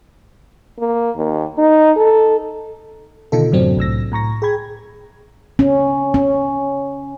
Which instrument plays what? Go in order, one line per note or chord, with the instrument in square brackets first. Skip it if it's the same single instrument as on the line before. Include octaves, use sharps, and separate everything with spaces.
[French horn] A#3
D#2
D#4
A4
[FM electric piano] B2 D3 D#3 D#4 F4 A4
F#2 A2 C3 F#3 C4 D4
C2 A2 E6 A#6
A2 A#5 C#6 A#6
G#4 G5 B5 G#6
[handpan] C#4
C#4